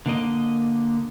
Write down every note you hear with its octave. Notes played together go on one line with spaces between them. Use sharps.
D3 A#3 D#5